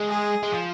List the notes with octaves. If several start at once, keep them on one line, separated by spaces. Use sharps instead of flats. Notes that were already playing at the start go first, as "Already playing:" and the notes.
Already playing: G#3
G#4
G#3
F3